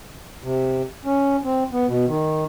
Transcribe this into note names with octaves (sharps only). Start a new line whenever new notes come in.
C3
C#4
C4
B3
B2
D#3